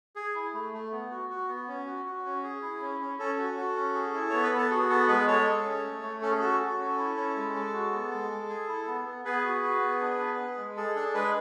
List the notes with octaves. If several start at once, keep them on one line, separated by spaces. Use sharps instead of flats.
G#4
E4
A3
A3
B3
F#4
F#4
B3
C#4
F#4
F#4
C#4
G#4
E4
C#4
C#4
C#4 A4
F#4
F#4
C#4
G#4
E4
B3 C#5
B4
B3
A4
F#4 G#4
B3 A4
G#3 G#4 B4
G#3 A4 C#5
G#4
C#4
A3
A3
C#4 A4
G#4
F#4 A4
F#4
C#4
E4
C#4
G#3
G#3
F#4
B3
G#3
G#3
G#4
E4
B3
B3
B3 G#4 B4
F#4
F#4
B3
D4
B3
G#4
G#3
G#4 A4
D4 A4
G#3 G#4 B4